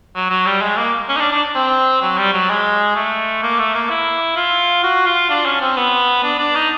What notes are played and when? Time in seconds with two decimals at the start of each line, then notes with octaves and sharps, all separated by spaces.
0.15 F#3
0.30 F#3
0.46 G3
0.62 G#3
0.77 A#3
1.09 C#4
1.17 D#4
1.20 D4
1.32 D4
1.55 C4
2.02 F#3
2.18 G3
2.33 F#3
2.49 G#3
2.96 A3
3.43 A#3
3.59 A3
3.75 A#3
3.90 E4
4.36 F4
4.83 F#4
5.06 F4
5.30 D4
5.46 C#4
5.61 C4
5.77 B3
6.23 D4
6.39 D4
6.55 D#4